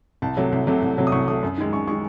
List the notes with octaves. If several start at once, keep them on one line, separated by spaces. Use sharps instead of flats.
C2 A5
C3 F#3 A3
C2
C3 F#3 A3
C2
C3 F#3 A3
D#6
C2 C#6
C3 F#3 A3 D#6
F#2
D#3 G#3
F#2 C#6
D#3 G#3 C#6